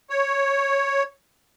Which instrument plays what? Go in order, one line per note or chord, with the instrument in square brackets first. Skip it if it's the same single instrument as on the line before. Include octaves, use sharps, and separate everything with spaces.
[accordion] C#5